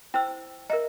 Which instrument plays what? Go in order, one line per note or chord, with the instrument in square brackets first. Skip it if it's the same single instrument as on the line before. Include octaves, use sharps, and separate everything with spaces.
[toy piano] E4 C5 E6 [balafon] G5
[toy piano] A#4 E5 A#5 [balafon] D#5